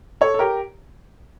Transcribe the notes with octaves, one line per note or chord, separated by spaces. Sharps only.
A4 C#5
A4
G4 A#4